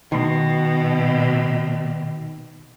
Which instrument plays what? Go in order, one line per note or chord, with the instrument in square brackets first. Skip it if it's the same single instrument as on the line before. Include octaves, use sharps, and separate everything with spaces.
[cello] B2 [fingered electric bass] D#3